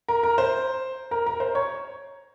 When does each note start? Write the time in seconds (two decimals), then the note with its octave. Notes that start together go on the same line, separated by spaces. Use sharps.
0.08 A#4
0.23 A#4
0.38 C5
1.11 A#4
1.26 A#4
1.40 C5
1.55 C#5